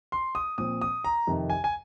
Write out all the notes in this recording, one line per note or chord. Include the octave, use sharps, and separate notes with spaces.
C6
D#6
A#2 F3 C4 D#6
D#6
A#5
F2 C3 D#3
G#5
G#5